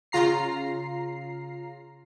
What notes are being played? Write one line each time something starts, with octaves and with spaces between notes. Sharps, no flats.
C#3 F4 A#5 C7